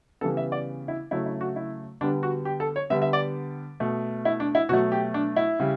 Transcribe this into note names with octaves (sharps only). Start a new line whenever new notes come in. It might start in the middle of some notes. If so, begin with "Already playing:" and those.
C#3 E3 G3 B3 A4
E5
D5
E4
C#3 F#3 A3 E4
E4
F#4
E4
D3 G3 B3 D4
F#4
G4
A4
C#5
D3 G3 B3 E5
E5
D5
B2 A3
E4
D4
E4
B2 F#3 A3 F#4
G4
D4
E4
C#3 G3